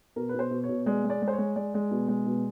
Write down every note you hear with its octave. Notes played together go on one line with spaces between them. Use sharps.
B2 A#4
B4
B2 C5
B2
C#5
B2
G#3 D5
G#3
D5
G#3
C5
C#5
G#3
G#3 D5
G#3
B2
G#3
B2